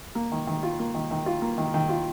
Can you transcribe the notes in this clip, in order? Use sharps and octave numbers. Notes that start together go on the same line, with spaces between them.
A#3
D#3
D#3
F4
A#3
D#3
D#3
F4
A#3
D#3
D#3
F4